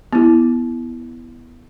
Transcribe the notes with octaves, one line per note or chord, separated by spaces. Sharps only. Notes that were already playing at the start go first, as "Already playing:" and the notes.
B3 E4